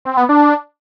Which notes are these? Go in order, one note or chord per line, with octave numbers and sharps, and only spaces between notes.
C4
B3
D4